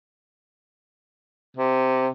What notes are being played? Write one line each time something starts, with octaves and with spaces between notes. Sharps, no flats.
C3